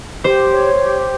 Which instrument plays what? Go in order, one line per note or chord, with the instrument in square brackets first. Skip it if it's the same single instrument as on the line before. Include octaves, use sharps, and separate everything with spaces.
[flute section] G4 [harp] C5
[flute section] C#5
G4